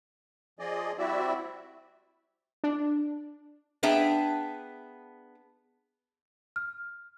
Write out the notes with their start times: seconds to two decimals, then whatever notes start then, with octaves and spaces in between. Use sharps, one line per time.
0.59 F3 G#4 D5 D#5
0.98 G3 C4 E4 F#4 D5 E5
2.64 D4
3.83 B3 D4 G#4 E5 G5 A5
6.56 F6